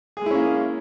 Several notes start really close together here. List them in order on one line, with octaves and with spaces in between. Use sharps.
G#4 G#3 E4 C#4 A#3